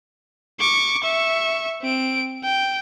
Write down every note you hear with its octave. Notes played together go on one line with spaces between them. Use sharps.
C#6 D6
E5 C#6
C4 D7
G5